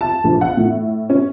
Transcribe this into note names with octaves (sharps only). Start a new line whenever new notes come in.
A5
A#1
F#5
A2
C#4